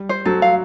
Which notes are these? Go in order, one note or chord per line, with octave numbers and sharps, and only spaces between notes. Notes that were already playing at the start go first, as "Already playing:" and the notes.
Already playing: G3
C5
F#3 A4
F5